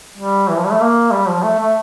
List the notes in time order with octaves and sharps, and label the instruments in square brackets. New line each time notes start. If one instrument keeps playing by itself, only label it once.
[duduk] G3
E3
F3
G3
A3
A#3
G3
F3
A3
A3